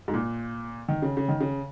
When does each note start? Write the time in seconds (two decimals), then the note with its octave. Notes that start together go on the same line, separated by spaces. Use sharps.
0.08 G#2
0.14 A#2
0.88 D#3
1.02 C#3
1.17 C#3
1.28 D#3
1.40 C#3